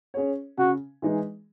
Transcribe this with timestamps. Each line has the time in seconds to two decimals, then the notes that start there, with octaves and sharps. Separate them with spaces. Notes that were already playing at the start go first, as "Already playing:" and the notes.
0.14 C#4 G#4 C#5
0.58 C#3 F#4
1.02 E3 G#3 D#4 G#4